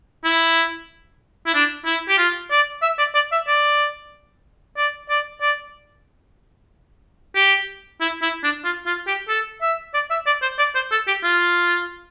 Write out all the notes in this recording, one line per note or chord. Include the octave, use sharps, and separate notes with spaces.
E4
E4
D4
E4
G4
F4
D5
E5
D5
D5
E5
D5
D5
D5
D5
G4
E4
E4
D4
F4
F4
G4
A4
E5
D5
E5
D5
C5
D5
C5
A4
G4
F4